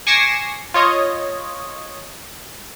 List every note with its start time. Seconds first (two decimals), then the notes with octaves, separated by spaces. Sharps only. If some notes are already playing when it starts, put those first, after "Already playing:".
0.07 G#5 C#6 D6 A#6 C7 E7
0.74 F4 C#5 D#5